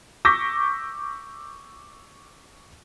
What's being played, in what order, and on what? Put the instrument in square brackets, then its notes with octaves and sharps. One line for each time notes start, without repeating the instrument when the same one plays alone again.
[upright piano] C#6 D6 E6 G6 A#6 B6